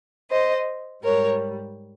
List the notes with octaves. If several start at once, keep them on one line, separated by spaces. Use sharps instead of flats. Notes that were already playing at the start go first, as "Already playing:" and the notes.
C5 D#5
G#2 G3 A#4 C#5